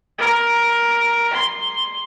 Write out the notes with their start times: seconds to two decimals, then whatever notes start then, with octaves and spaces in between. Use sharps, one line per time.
0.18 A#4
1.33 C6